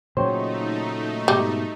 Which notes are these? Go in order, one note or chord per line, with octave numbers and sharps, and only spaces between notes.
A#2 C#3 F#3 A3 D#4 C5 C#5 G5
G#2 B2 G3